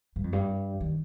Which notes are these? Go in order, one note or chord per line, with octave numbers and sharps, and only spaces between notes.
G2
F2
G2
D#3